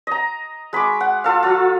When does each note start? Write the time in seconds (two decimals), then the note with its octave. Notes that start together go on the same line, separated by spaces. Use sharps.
0.07 D#5 A#5
0.73 G#3 B5 C#6 D6
1.01 F#5
1.24 F4 A4 F5
1.43 F#3 F4